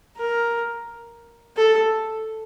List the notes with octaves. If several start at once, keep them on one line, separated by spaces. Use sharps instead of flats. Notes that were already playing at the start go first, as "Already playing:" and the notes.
A#4
A4